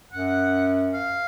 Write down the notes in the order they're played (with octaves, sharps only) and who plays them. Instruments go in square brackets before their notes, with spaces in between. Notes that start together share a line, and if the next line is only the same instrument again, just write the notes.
[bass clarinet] F#2 [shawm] F#5
[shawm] F5